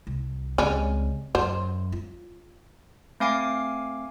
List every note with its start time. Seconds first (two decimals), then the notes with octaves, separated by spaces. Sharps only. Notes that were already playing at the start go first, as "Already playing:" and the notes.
0.07 C2
0.58 C#2 G3 G#3 C4 C#4
1.35 F#2 C5
1.92 F4
3.20 A3 C4 F5 G#5 D6 C7